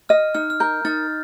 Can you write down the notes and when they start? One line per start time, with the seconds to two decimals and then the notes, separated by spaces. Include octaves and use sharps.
0.09 D#5 F6
0.35 D#4 F6
0.50 F6
0.60 A#4 G6
0.85 D#4 F6 A6